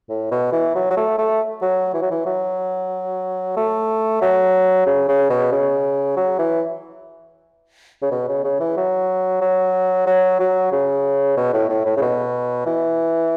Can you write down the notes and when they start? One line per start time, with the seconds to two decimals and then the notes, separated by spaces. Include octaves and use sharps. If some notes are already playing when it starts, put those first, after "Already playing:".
0.09 A2
0.31 B2
0.53 E3
0.75 F#3
0.90 F#3
0.97 A3
1.18 A3
1.62 F#3
1.94 E3
2.02 F#3
2.11 E3
2.26 F#3
3.57 A3
4.22 F#3
4.86 C#3
5.08 C#3
5.30 B2
5.52 C#3
6.17 F#3
6.39 E3
8.02 C#3
8.12 B2
8.28 C#3
8.44 C#3
8.60 E3
8.77 F#3
9.42 F#3
10.07 F#3
10.40 F#3
10.72 C#3
11.37 B2
11.54 A2
11.70 A2
11.86 A2
11.97 C#3
12.02 B2
12.67 E3